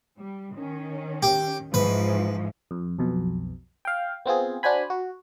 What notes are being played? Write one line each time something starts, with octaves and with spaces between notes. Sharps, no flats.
G3
D#3 C#4
G4
G#2 E3 F3 B4
F2
B1 F2 B2
F5 G5
B3 C4 F4 G#4
D4 F#4 C5 G#5 B5
F#4